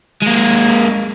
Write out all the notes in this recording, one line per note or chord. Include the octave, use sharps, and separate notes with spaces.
G#3 A#3